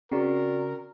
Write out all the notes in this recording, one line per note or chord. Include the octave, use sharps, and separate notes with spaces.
C#3 C4 F#4 A#4 D5